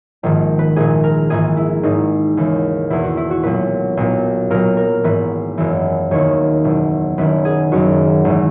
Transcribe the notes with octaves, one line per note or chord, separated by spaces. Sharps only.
A#1 G#2 D#3
B4
A#1 A#2 G#4
A#4
A#1 G#2 E3 G#4
E4
G#1 G#2 E3 D#4
D#2 C#3 E3
E1 E2 B2 E4
F#4
E4
F#4
B1 A#2 B4
B1 A#2
B1 A#2 A#4
A#4
G#1 G#2 E3 B4
F#1 F#2 E3
E1 D#2 D#3 C#5
F#1 E2 B2
F#1 F#2 D#3 B4
G#4
F#1 F#2 D#3 F#4
G#1 E3